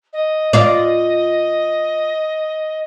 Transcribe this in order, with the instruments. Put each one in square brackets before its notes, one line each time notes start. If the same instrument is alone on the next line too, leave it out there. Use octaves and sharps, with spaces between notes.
[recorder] D#5
[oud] F4 D5